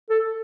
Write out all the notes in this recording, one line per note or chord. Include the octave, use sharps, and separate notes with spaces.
A4